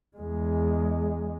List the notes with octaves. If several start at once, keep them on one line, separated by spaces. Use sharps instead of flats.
E2 G#3